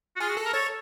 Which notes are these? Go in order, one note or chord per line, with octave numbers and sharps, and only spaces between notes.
F#4
F4 G#4
F#4
A4
A#4
A4 C#5